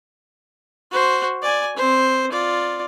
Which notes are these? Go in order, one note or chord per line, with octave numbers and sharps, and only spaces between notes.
F#4 C5
D5 G#5
C4 C5
F4 D5